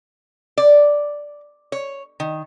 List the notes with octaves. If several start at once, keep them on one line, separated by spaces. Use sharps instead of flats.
D5
C#5
D#3